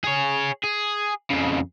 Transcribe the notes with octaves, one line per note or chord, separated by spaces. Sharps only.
G#4 C#5
G#4
F2 C#3